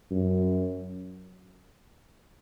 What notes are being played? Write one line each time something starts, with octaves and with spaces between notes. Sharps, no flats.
F#2